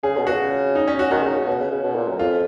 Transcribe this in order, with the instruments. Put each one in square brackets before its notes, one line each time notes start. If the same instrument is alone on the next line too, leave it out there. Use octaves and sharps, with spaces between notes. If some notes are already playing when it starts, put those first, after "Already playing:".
[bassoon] C#3 [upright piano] G#4
[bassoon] B2
[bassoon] C#3 [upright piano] F#4
[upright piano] D#4
C#4
F#4
[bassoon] D#3 [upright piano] F#4
[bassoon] C#3
C#3
B2
C#3
C#3
B2
A#2
F#2
[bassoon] F2 [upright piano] F4